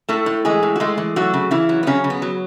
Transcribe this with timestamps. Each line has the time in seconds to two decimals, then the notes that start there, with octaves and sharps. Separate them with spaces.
0.09 A2 A3 A4
0.26 A2
0.45 E3 G#3 G#4
0.63 A2
0.76 F#4
0.80 G#3 A3 G#4
0.98 E3
1.16 F#3 A3 F#4
1.34 C#3
1.51 C#3 E3 E4
1.69 F#3
1.83 B3
1.87 C#3 F#3 C#4
2.04 C#3
2.10 B3
2.22 F#3